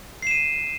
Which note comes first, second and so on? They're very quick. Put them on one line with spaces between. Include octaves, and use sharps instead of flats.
C7 E7 D#7